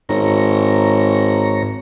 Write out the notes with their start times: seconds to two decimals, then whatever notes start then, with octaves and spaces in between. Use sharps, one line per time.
0.09 G#1 G#2 C#5 A#5